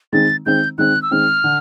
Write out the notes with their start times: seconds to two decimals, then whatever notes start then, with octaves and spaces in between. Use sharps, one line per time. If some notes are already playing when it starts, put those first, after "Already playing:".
0.13 D#3 G#3 C4 A6
0.46 D#3 G#3 C4 G6
0.78 D#3 G#3 C4 F#6
1.02 E6
1.11 D#3 G#3 C4 F6
1.44 D3